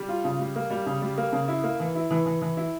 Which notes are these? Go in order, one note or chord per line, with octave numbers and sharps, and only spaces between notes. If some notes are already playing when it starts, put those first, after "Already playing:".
Already playing: G3
F4
C#3
G3
A#3
G3
C#3
G3
A#3
C#3
E4
A#3
E3
E4
E3
E3
E3
E4